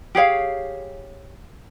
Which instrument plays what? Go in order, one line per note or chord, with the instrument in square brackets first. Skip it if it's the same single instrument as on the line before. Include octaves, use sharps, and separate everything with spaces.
[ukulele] G4 G#4 C#5 F5